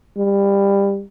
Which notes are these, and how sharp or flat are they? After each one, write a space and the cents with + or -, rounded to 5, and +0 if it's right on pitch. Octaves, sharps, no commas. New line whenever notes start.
G3 +20